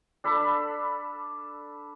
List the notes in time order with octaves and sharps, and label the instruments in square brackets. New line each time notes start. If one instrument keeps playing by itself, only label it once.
[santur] D4 A4 B5